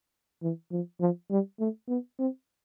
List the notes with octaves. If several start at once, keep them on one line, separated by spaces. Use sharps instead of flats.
E3
F3
F3
G3
A3
B3
C4